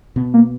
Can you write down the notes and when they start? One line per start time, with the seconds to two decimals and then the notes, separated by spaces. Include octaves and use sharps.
0.16 B2 B3
0.34 A#3